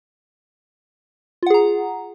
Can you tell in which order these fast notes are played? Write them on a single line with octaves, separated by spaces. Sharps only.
F4 F#5 G#4 A#5